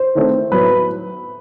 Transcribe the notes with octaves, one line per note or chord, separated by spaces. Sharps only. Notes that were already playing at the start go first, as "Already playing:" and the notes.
Already playing: C5
D#3 A3 C4
A2 F#3 B3 E4 B4